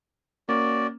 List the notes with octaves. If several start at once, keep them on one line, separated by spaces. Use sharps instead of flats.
A#3 C#4 F#4 D5